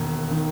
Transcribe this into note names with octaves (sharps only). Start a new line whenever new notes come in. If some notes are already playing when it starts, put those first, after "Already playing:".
Already playing: E1 D#2
D#3